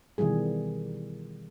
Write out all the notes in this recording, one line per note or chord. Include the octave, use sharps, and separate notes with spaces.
B2 D#3 E3 G3 G#4